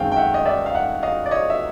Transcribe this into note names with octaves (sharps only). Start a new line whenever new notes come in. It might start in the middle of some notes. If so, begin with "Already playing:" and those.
Already playing: F#2 D#3 G#3 C4 F5 G5 G#5
G5
E5 F#5
D#5
D5 E5
F5
E5 F#5
D#5 F5
D5
C#5 D#5
E5